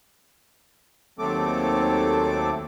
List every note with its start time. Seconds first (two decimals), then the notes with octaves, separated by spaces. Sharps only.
1.19 D#2 F#3 A3 C4 A4 D6